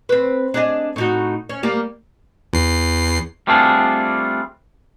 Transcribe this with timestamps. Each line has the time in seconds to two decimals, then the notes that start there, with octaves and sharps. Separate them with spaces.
0.09 C4 B4
0.54 D4 G#4 D#5
0.96 A2 D#4 F#4
1.49 C#4
1.63 G3 A#3 G4
2.53 E2 C7
3.47 G3 A3 C4 D4 F4 G#4